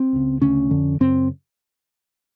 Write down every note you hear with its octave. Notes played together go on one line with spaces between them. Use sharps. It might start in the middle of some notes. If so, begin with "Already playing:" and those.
Already playing: C4
C#2 C#3
D2 C#3 C#4
F2 D3
F#2 C#3 C4